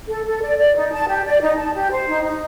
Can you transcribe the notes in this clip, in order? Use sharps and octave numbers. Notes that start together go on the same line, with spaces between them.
A4
A4
D5
D5
D#4
A5
G4
D5
D#4
A5
G4
C5
D#4
D#4